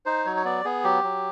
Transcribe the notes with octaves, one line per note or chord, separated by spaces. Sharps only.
D#4 C5
F#3 C#5
C#5
B3 D5
B3 G#4
F#3 G4
F#3